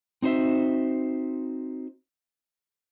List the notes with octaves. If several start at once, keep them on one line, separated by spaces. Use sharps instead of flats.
C4 D#4 F#4 C5 E5